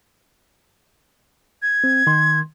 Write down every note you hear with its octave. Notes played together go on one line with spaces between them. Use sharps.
G#6
C4
D#3 C6